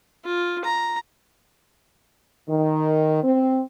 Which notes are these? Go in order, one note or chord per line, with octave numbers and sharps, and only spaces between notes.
F4
A#5
D#3
C4